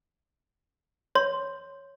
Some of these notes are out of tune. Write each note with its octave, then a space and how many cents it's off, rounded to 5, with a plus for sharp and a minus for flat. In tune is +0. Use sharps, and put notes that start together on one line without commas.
C#5 +0 C6 +0